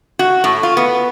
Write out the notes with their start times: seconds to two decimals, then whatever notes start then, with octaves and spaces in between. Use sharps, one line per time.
0.19 F#4
0.44 A2
0.63 F4
0.77 B3